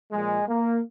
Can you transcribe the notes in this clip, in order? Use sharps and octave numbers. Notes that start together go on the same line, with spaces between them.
A#2 F3 G#3
A#3